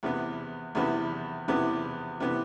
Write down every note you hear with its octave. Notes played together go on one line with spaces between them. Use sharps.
E2 C3 E3 B3
E2 C3 E3 B3
E2 C3 E3 B3
C3 E3 B3